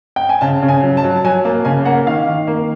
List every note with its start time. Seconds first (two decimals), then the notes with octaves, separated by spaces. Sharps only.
0.16 G5
0.29 G#5
0.41 C#3 A5
0.63 C#3
0.68 G#5
0.83 F#3
0.97 A5
1.04 F#3
1.16 A5
1.24 F#3 G#5
1.45 A#3 A5
1.65 C#3 G#5
1.85 A#3 F#5
2.07 D#3 F5
2.28 D#3
2.47 A#3